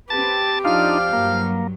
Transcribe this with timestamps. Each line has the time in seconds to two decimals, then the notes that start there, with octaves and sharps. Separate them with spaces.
0.10 C4 G4 B4 A5 A6
0.65 F2 F3 D4 D#4 F4 D5 F5
1.13 G2 F#3 A#3